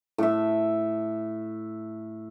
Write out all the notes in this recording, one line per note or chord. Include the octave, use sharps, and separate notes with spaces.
A2 E5